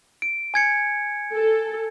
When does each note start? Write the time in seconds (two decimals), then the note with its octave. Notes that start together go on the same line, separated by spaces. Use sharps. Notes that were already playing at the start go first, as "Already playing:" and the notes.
0.22 D7
0.54 G#5 G#6 C#7
1.33 A4